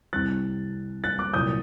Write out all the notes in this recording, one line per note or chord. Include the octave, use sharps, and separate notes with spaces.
C2 C3 G3 F#6 A6
F#6 A6
D6 F#6
C2 A#2 F#3 D#6 G6